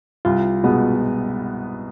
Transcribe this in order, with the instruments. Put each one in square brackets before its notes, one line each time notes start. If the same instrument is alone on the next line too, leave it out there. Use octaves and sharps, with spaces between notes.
[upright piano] C2 [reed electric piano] F4
[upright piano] B2 G#3 B3